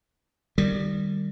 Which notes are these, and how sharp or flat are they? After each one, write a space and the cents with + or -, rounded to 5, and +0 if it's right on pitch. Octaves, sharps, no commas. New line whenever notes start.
D#3 -25 G3 +0